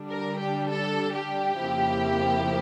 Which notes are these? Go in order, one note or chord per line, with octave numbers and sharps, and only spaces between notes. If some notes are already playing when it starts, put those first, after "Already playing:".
Already playing: D3 G3 D4
A#4
G4
A4
G4
F2 C#3 F3 A#3 E4